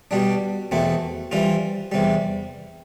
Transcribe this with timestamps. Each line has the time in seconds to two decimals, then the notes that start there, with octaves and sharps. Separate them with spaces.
0.11 B2 G3 D4
0.71 E2 B2 A3 C4
1.32 E3 G3 C4 F4
1.92 E2 C3 G3